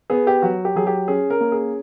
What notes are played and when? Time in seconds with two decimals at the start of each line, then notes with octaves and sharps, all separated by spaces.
0.10 B3 G#4
0.27 G4
0.42 F#3 F#4
0.65 G4
0.76 F#3 G#4
0.87 G4
1.08 C#4 G#4
1.30 A#4
1.41 A#3
1.52 G#4